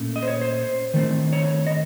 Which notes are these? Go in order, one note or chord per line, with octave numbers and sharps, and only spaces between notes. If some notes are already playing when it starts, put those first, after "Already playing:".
Already playing: A#2 A3 C#4
D#5
C5
C#5
C5
D#3 A3 C4
C#5
D#5